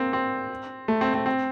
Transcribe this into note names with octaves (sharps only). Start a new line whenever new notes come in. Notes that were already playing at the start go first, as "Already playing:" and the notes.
Already playing: A#3 C4
C4
A3
C4
C4
C4